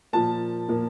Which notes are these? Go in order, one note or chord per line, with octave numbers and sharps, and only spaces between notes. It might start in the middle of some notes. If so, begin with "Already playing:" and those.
A#2 F3 A#3 A5
A#2 F3 A#3